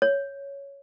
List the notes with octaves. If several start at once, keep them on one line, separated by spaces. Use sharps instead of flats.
C#5